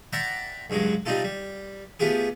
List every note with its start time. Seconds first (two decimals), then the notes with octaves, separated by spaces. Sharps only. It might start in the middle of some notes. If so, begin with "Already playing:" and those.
0.13 D5 E5 F#5 G5 A#5 C6
0.70 C#2 G2 F#3 G#3
1.06 C3 G3 C4 D#4 F4 A4
1.24 G3
2.00 A3 B3 F4 G4 G#4